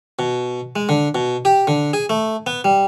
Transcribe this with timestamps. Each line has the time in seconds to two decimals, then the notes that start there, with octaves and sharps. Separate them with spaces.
0.19 B2
0.76 G#3
0.89 D3
1.15 B2
1.45 G4
1.67 D3
1.93 G#4
2.10 A3
2.47 B3
2.64 G3